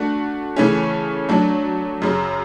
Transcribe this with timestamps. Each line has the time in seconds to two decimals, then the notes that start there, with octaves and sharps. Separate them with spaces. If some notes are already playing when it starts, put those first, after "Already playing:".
Already playing: A3 D4 F#4
0.56 C#3 E3 A3 C#4
1.29 F#3 A3 D4
2.02 F#2 C#3 F#3